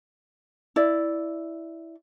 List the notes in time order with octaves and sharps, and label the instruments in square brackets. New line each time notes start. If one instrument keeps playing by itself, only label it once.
[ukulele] E4 D5